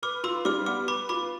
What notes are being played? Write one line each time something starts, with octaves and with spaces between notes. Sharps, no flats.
B4 D6 F6
F4 C6 E6
G3 D6 F6
B3 D6 F6
B4 B5 D6
F4 B5 D6